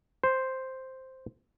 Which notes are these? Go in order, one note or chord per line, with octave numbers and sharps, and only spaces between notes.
C5